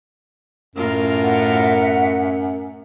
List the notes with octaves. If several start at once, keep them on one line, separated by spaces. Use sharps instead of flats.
F#2 A2 F4 A#4
E5 F#5